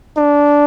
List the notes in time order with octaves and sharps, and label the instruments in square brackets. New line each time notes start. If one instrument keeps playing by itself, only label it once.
[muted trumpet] D4